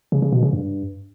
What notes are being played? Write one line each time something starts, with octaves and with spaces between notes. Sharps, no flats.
C#3
C#3
B2
C#3
G2